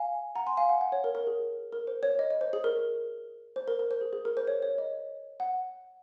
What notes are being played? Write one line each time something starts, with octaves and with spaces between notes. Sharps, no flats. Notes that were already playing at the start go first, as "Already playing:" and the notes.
Already playing: F5 G#5
F#5 A#5
G#5 C6
F5 G#5
F#5
F#5
C#5
A#4
A#4
G#4
A#4
C5
C#5
D#5
D#5
C5
G#4
A#4
C5
A#4
A#4
C5
G#4
G#4
A#4
C5
C#5
C#5
D#5
F#5